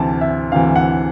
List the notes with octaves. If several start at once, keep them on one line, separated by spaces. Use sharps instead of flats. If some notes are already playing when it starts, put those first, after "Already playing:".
Already playing: D2 C3 E3 A5
E5
D2 C3 E3 F5
F#5